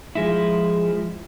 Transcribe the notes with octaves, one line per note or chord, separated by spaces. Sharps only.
F3 G#3 E4